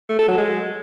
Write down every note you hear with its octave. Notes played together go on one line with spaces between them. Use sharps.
A3
A4
F#3
G#3